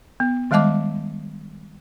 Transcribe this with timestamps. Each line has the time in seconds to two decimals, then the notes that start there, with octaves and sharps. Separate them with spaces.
0.20 B3
0.51 D#3 G3 G#3 D#5 A5 D6